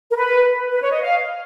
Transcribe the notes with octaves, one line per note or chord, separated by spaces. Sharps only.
A#4
B4
B4
C#5
D#5
F5